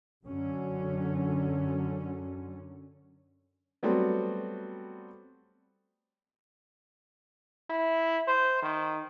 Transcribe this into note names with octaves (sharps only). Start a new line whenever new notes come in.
F#2 D3 F#3 C#4
F#3 G3 A3 B3 C4 F#4
E4
C5
D#3